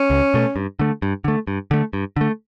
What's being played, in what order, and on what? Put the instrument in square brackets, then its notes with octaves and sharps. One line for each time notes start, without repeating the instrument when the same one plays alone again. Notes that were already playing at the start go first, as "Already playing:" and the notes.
Already playing: [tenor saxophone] C#4
[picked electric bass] C#2
B2 A3
G2
D3 A3
G2
D3 A3
G2
D3 A3
G2
D3 A3